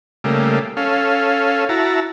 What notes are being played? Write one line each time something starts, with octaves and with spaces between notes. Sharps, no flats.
C#3 G3 A3 A#3
C#4 A4 F5
E4 F#4 A5 A#5